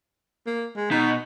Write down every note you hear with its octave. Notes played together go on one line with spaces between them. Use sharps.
A#3
G#3
B2 D#4